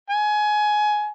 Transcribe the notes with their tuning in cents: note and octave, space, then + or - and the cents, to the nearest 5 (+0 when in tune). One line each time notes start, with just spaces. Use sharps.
G#5 +20